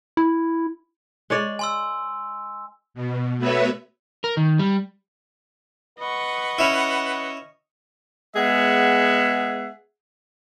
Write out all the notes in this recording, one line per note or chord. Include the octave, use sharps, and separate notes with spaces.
E4
G#3 C#5 D5
G#5 C6 E6
B2
A3 B3 F#4 B4 C#5 E5
A#4
D#3
G3
B4 D#5 F#5 C#6
C#4 E4
G#3 B3 G#4 E5 F#5